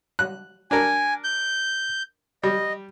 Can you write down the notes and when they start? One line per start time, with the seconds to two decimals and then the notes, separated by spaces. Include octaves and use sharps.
0.19 F#6
0.71 D4 A#4 G#5
1.24 G6
2.43 G3 D#5